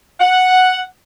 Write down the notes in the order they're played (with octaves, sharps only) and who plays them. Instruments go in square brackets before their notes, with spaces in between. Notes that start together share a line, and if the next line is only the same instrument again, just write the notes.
[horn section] F#5